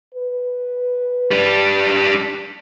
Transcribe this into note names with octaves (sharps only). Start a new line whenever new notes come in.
B4
G3 D4